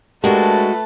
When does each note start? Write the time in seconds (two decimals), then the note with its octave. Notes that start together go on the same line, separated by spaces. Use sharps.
0.24 G#3 A3 D4 F#4 G4 A#4 B4 A5